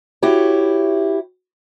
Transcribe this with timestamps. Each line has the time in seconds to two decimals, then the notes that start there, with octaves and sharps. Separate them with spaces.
0.22 E4 F#4 G4 C#5